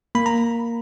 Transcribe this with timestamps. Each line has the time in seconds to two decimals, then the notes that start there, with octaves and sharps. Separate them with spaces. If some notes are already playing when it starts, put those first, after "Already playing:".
0.15 A#3 B5
0.26 A#5